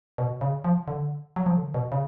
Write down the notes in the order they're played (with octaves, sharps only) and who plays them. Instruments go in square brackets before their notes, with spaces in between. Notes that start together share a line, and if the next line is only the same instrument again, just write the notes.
[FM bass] B2
C#3
F3
D3
F#3
F3
D3
B2
C#3